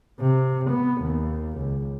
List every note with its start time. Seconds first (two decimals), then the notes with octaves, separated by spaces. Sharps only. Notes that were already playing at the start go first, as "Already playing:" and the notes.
0.20 C3
0.70 B3
1.01 D#2
1.57 C#2